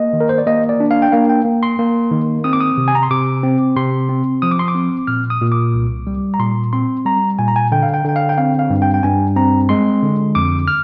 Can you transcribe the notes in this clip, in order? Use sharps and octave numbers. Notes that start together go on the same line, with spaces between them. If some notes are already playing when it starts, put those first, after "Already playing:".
Already playing: A#3 D#5
D#3
A#4
C5
D5
A#3 D#5
D5
D4
F5
G5
A#3 F5
G5
A#3
C6
A#3
D#3
C4 D#6
D6
D#6
C3
G#5
A#5
C6
C3 D6
C4
C3 C6
C4
F3 D#6
D6
C6
D6
C4
A#2 F6
D#6
A#2
D6
C2
G3
A#5
A#2 C6
C4 C6
G3 A#5
A#2 G#5
A#5
G#5
D3 G5
F5
G5
D3 G5
F5
G5
C4 F5
F5
G2
G5
G5
G2 G#5
C4 A#5
G#3 C6
D3
F2 D6
F6